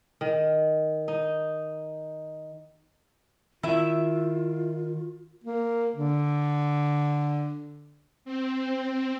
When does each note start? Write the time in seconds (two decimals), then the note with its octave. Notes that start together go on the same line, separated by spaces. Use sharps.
0.21 D#3
1.08 D#4
3.63 D#3 E4 F4 E5
5.44 A#3
5.96 D3
8.25 C4